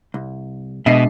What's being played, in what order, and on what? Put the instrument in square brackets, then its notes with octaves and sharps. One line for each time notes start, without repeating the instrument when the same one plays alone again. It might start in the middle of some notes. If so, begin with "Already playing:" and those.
[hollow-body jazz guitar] C2
[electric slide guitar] B2 [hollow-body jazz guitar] G#3 D4 E5 [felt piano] D#5 C7